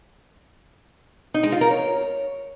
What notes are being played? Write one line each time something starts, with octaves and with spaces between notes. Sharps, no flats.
D#4
G#3
F4
A#4
C#5